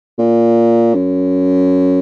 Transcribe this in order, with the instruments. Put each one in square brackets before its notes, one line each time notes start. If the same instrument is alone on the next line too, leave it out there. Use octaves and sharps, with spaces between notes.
[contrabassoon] A#2
F#2